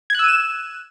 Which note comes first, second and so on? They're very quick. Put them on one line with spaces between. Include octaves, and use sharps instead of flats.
G#6 F#6 E6 D#7 E7